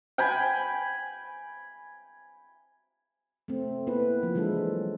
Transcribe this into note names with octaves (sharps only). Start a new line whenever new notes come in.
G5 G#5 B5
A3 C4
A#3 B3 E4 B4
F3
E3 F#3 G#3 D4 A4